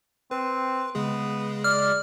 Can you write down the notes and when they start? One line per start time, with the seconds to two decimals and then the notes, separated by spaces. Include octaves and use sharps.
0.31 C4 B4
0.95 C#3 G#3 B3 G#4
1.64 D5 F6